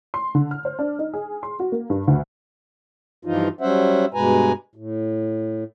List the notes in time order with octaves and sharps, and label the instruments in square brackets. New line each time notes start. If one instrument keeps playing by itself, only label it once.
[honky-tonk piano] C6
D3
F6
C5
D4
D#4
G#4
C6
F#4
A#3
G2
D2
[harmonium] G2 E3 F3 D#4 F4
F#3 G3 C#4 C5 E5 F#5
G2 B2 G#3 B4 G#5 A#5
A2